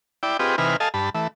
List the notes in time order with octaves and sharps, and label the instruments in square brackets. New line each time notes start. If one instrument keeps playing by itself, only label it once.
[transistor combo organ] E4 D5 G5
C4 F4 G4 G#4 B4 D#5
C3 E3 D#4 B4 G#5 F6
A4 D#5 F5 G#5 A5
G2 A5 B5
E3 A3